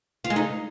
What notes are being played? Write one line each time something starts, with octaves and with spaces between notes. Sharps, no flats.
F4
G#3
D#4